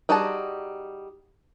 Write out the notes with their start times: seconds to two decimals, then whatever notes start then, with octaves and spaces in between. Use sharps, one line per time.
0.09 G3 D#4 F#4 G#4 A5